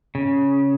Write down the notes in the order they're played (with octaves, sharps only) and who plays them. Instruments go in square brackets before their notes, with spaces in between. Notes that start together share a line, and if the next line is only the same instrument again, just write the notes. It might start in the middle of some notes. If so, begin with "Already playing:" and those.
[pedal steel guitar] C#3